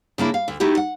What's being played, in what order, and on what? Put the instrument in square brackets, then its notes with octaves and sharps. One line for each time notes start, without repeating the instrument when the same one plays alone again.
[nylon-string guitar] C#3 A#3 D4 E4
F5
D2
A3 D#4 E4 F#4 G4
F#5